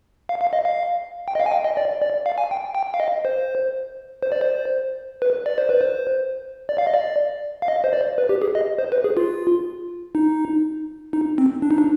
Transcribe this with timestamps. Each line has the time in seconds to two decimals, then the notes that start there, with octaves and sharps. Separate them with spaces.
0.29 F5
0.41 F5
0.53 D#5
0.65 F5
1.28 G5
1.35 D#5
1.40 F5
1.46 G#5
1.51 G5
1.65 D#5
1.77 D5
2.02 D5
2.26 F5
2.38 G#5
2.51 G5
2.75 G5
2.94 F5
3.00 D#5
3.25 C5
4.23 C5
4.32 D5
4.41 C5
5.22 B4
5.46 D5
5.58 C5
5.69 B4
5.81 C5
6.69 D5
6.78 F5
6.87 D#5
6.94 D5
7.62 F5
7.68 D#5
7.84 C5
7.93 D5
8.18 B4
8.29 G4
8.42 G#4
8.55 D#5
8.78 C5
8.92 B4
9.04 G#4
9.17 F4
10.15 D#4
11.13 D#4
11.38 C4
11.62 D4
11.71 D#4
11.78 D4